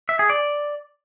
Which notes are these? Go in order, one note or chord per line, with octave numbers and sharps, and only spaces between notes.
E5
G#4
D5